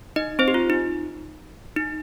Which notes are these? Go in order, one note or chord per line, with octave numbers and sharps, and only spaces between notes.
D#4 D#5
C4 C5
G4
F4
D#4
D#4